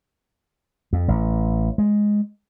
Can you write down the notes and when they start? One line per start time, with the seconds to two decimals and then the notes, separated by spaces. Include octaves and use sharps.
0.93 F2
1.08 A1
1.78 G#3